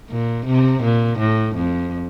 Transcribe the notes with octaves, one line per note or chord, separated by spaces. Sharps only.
A#2
C3
A#2
A2
F2